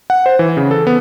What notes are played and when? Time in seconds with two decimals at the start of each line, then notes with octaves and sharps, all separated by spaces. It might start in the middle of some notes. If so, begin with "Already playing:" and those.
0.10 F#5
0.26 C5
0.39 E3
0.57 C#3
0.71 A4
0.87 B3